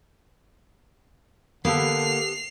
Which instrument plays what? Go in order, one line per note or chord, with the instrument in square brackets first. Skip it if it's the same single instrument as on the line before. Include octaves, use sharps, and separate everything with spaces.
[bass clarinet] D3 [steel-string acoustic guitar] A#3 [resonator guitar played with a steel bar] B3 G4 A4 [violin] C7 F7